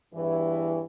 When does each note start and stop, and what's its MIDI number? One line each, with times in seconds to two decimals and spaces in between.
0.14 0.82 40
0.14 0.82 43
0.14 0.82 52